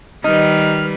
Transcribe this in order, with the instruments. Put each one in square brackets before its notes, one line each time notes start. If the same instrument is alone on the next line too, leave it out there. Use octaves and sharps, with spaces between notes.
[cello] D#3 [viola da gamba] G3 B4 [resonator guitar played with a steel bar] D#4 [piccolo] F6